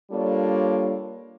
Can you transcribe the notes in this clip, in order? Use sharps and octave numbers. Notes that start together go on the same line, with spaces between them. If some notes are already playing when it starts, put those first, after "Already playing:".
G3 A#3 D4 F4 A4 C#5